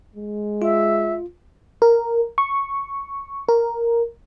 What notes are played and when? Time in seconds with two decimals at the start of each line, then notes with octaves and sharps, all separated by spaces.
0.16 G#3
0.62 F4 E5
1.82 A#4
2.38 C#6
3.49 A#4